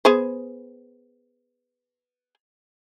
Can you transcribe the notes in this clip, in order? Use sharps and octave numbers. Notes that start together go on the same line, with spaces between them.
B3 G#4 C5